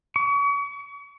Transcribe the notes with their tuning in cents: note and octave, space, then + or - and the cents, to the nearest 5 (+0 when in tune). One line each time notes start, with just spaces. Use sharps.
C#6 +40